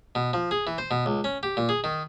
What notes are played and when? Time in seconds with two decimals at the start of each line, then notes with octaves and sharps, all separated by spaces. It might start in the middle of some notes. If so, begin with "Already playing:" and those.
0.15 B2
0.33 F3
0.51 G#4
0.67 E3
0.78 C5
0.91 B2
1.06 C#2
1.24 C#4
1.43 G4
1.57 A#2
1.69 G#4
1.84 D#3